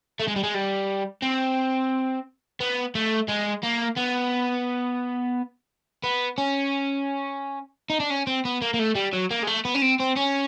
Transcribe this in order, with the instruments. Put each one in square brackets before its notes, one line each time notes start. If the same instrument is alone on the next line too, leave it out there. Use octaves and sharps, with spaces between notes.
[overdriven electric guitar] A3
G#3
G3
G#3
G3
C4
B3
A3
G#3
A#3
B3
B3
C#4
D#4
D4
C#4
C4
B3
A#3
A#3
A3
G3
F#3
A#3
G#3
A3
B3
C#4
C4
C4
C#4